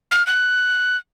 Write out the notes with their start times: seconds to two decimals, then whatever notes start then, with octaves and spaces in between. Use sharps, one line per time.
0.11 F6
0.27 F#6